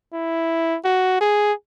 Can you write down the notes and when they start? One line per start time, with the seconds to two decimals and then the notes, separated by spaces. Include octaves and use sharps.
0.13 E4
0.84 F#4
1.21 G#4